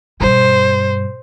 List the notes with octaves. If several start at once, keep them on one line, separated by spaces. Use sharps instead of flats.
G2 B2 C5